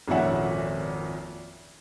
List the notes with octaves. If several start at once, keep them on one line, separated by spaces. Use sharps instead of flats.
G#1 F2 A#2 C#4 E5 F#5